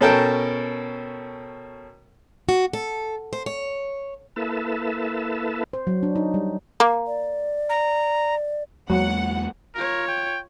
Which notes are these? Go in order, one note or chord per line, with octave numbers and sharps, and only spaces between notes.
B2 C#4 A4 A#4 G5 A5
F#4
A4
C5
C#5
A#3 E4 A4 B4 E5 A5
C5
F#3
D4
D#4
G3
A#3
D5
A#5
E2 F#3 G#3 A#3 F#5
F4 A#4 C#5
G5